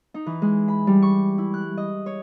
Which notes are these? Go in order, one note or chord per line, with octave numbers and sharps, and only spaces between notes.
D#4
E3
G#3
B5
G3
C#6
E4
F#6
D#5
C#5